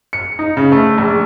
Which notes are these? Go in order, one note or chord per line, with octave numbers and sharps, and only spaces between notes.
C#7
D#4
C#3
A3
A#1